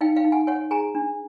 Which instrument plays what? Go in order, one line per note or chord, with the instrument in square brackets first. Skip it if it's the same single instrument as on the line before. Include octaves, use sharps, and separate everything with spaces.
[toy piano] D#4 F5 G5
F5 G5
D#4
F#5 G#5
C#5 F#5 G#5
G#4 G#5 A#5
D4